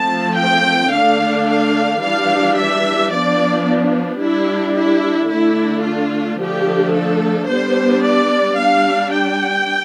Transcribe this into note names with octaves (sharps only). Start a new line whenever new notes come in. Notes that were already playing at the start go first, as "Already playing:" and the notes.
Already playing: F3 A3 C4 A5
G5
D3 A3 D4 F5
F5
E3 G3 D4 F5
E5
F3 B3 D4 D5
G3 D4 E4
E4
D3 A3 D4 E4
F4
D3 F3 A3 D4 G4
A4
G3 B3 D4 C5
D5
G3 D4 F5
G5